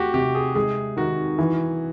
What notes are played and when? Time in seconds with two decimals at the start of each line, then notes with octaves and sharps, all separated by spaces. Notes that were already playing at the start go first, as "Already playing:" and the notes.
Already playing: A3 F#4 G4
0.14 C3 G4
0.35 G#4
0.55 G#3 G#4
0.97 D#3 F#4
1.39 E3